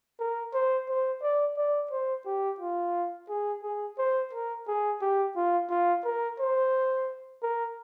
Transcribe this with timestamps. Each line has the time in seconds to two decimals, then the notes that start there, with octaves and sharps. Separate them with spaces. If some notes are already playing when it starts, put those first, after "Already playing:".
0.20 A#4
0.54 C5
0.89 C5
1.22 D5
1.57 D5
1.91 C5
2.26 G4
2.60 F4
3.29 G#4
3.63 G#4
3.98 C5
4.33 A#4
4.68 G#4
5.01 G4
5.36 F4
5.70 F4
6.05 A#4
6.40 C5
7.43 A#4